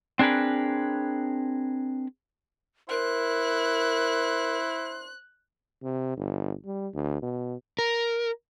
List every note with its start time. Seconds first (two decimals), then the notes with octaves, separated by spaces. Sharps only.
0.19 C4 D4 G#4 A#4 B4
2.90 E4 A#4 C5 F#6
5.83 C3
6.17 G1
6.65 G3
6.94 D2
7.22 B2
7.79 A#4